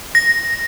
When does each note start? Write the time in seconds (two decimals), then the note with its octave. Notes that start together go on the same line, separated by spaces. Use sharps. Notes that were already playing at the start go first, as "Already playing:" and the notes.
0.15 A#6